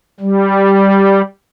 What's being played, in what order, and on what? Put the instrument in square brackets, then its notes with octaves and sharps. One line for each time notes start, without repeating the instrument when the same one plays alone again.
[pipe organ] G3